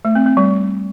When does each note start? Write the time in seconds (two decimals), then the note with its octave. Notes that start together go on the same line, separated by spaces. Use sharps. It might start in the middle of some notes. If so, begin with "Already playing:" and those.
0.05 A3
0.15 C4
0.26 C4
0.37 G3